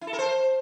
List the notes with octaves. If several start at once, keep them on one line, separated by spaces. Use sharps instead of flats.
E4
A4
A#4
C5